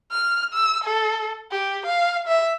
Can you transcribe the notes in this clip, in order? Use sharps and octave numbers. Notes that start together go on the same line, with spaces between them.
F6
E6
A4
G4
F5
E5